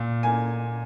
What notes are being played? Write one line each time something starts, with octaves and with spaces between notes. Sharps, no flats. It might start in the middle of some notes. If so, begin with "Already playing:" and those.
Already playing: A#2
A#3 G#5